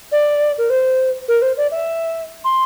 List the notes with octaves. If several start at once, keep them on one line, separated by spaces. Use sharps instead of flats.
D5
A#4
C5
A#4
C5
D5
E5
C6